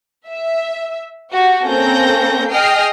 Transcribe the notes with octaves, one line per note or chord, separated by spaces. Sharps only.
E5
F#4 G4
A#3 C4 C#4 A4 G6 A#6
G#4 D#5 G5 D#6 F6 C7